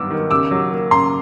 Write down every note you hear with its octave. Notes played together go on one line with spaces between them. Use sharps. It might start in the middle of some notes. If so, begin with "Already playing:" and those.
Already playing: G2 D#3 F#3 B3 D6 E6
D#3
C#3 D6 E6
F#3
A#3
C#3 A#5 C6